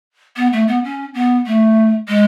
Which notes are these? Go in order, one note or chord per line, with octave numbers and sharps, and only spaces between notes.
B3
A3
B3
C#4
B3
A3
G#3